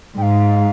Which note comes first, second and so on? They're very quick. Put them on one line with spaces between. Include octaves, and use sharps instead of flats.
G#2 G5 F5